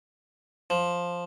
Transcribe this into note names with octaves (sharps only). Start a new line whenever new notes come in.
F3